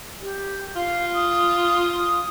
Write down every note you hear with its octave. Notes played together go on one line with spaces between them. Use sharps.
G4
F4 F5
D#6